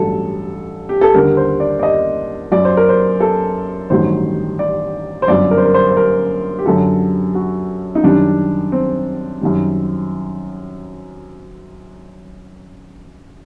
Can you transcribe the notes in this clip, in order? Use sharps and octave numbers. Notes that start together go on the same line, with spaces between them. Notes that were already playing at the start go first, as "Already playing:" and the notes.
Already playing: A1 G2 F#3 A4
G4
A4
D#2 D3 G3 A#4
C5
D5
D5
D#5
F#2 F#3 D5
C5
A#4
C5
A4
A1 G2 D#3 F#3 C5
D5
C5
G1 F#2 F#3 D5
A#4
C5
A#4
C5
C5
A#4
G4
F#2 D3 F#3 A4
F#4
D#4
F#2 D#3 G3 D4
C4
F#2 D#3 G3